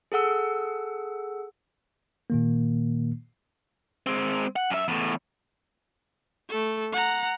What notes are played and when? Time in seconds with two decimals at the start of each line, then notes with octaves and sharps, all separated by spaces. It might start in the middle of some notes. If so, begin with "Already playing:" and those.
0.12 G#4 A4 F#5 E6
2.30 A#2 D#3 A#3
4.07 G#3 C4
4.56 F#5
4.70 F#2 E5
4.88 E2 A2
6.50 A3 A4
6.92 F#5 A#5